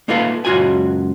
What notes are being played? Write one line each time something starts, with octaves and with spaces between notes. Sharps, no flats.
A#3 D#4 F4 A4 B4 F5
C#2 F#2 F4 F#4 G#5